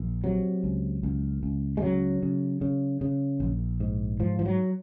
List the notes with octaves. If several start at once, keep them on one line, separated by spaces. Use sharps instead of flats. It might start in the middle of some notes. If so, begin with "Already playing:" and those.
Already playing: A#1
C3 F#3
C#2
C#2
C#2
G#3
C#3 F#3
C#3
C#3
C#3
A#1
G#2
G#2 F3
F3
F#3